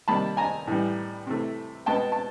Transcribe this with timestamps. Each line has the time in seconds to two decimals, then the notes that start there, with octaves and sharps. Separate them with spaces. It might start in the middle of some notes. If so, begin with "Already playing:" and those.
0.08 C3 D#3 G3 A#3 A5 B5
0.37 G#5 A#5
0.67 A2 E3 G3
1.27 C3 E3 A3
1.86 B2 G#3 B3 G5 A5
2.12 A5